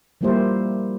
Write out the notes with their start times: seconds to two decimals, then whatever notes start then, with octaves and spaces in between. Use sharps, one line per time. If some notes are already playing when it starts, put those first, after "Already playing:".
0.21 F3 G3 A#3 E4 G4 C5